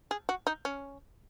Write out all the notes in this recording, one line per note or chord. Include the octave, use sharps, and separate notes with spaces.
G#4
F#4
D#4
C#4